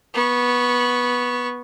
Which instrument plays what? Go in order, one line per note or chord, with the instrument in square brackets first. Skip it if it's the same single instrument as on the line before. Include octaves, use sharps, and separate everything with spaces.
[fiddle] B3 C#6